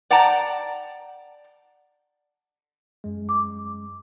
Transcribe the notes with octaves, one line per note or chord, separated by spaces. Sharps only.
D5 F#5 G5 A5 A#5
F#2 G#3
D6